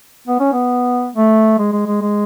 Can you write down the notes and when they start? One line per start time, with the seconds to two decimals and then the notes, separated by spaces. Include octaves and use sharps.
0.28 B3
0.40 C#4
0.52 B3
1.14 A3
1.58 G#3
1.72 G#3
1.87 G#3
2.01 G#3